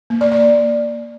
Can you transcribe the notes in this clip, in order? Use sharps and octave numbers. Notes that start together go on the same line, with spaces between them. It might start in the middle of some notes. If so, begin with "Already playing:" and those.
A#3
D5
D5